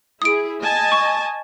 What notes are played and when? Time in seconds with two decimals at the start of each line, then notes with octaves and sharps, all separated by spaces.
0.22 E4 G#4 D#6 D7
0.60 D#5 G#5 A5
0.92 C#6